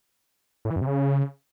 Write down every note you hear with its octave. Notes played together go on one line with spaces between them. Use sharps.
A2
E3
F#2
C3
C#3